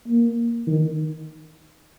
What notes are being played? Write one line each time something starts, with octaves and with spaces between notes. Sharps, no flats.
A#3
D#3